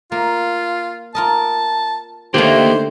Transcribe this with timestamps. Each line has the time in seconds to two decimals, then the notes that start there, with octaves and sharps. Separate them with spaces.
0.12 A#3 F4
1.15 F4 A#4 D#5 A5
2.34 D3 A3 A#3 D#4 G4 C5